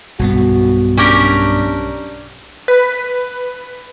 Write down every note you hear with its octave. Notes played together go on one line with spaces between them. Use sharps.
B1 G2 B3 F#4
C#4 D4 G4 A#4
B4